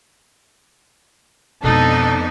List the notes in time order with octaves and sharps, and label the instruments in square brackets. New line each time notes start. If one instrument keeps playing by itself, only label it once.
[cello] F2 B3 [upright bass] B2 G#3 [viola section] D4 D#4 [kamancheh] A4